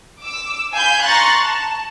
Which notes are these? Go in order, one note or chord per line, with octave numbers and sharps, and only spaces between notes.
D6 E6
F5 G#5 B5 G6
A#5 C6 C#6 F#6 A6 A#6
A5